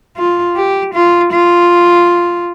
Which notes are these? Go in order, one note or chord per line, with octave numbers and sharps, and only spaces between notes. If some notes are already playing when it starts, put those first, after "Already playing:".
F4
G4
F4
F4